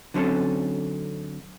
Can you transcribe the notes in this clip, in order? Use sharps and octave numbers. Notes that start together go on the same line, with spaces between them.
D3 F#3 C4 C#4 D#4 A4